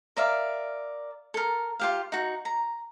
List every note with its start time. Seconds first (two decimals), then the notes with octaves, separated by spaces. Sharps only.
0.17 A#4 D5 E5 F5
1.34 A4 A#4
1.79 F4 G4 F5
2.12 D#4 F#4
2.45 A#5